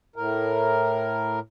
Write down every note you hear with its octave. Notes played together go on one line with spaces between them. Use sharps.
A2 A#4